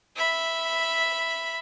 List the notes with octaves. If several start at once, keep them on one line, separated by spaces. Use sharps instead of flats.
E5 B5